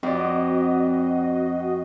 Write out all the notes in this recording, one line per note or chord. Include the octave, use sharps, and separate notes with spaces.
F2 C4 F#4 D5 D#5